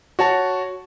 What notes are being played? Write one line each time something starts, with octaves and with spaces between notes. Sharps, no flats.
F#4 C#5 A5